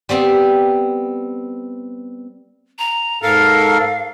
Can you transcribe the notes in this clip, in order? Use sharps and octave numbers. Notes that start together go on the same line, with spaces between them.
G3 B3 C4 B5
A#5
G#2 A4 A#4 F5